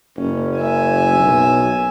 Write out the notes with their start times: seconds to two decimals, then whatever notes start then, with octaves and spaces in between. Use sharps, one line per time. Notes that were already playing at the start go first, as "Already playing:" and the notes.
0.17 F#1 C#4
0.57 E5 G#5
1.19 B1